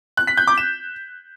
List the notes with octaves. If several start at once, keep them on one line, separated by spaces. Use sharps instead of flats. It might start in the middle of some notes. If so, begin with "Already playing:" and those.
F#6
B6
G6
D6
E7